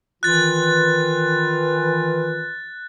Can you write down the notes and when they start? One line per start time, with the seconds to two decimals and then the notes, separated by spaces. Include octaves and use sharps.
0.23 D#3 E3 F4 F#6 A6